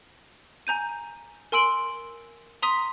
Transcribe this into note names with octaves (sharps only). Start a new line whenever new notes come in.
G#5 A#5 G6 D#7
A#4 G#5 C6 E6 D7 F#7
A#5 C6 D#6 B6 D#7